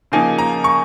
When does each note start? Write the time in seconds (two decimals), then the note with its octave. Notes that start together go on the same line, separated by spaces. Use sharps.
0.12 C#3 F3 A#3 D#4 G#5
0.38 A#5
0.64 C#6